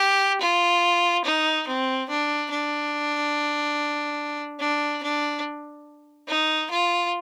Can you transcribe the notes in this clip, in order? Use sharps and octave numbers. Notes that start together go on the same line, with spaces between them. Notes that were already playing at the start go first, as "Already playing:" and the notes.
Already playing: G4
F4
D#4
C4
D4
D4
D4
D4
D#4
F4